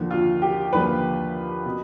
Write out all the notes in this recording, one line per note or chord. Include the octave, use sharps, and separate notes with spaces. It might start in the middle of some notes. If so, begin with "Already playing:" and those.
Already playing: D#2 D3 F3
F4
G4
D#2 D3 F3 B4
B2